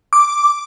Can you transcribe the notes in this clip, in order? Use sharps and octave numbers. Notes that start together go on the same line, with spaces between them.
D6